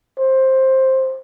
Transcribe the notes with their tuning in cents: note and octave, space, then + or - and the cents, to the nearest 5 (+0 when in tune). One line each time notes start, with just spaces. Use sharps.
C5 +10